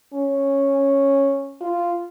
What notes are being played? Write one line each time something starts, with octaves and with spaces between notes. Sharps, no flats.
C#4
F4